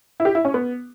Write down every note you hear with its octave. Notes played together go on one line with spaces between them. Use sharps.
E4
G4
E4
C#4
B3